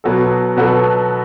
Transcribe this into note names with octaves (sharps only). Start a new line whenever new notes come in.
B2 F#3 B3 F#4 A4
B2 F#3 B3 F#4 A4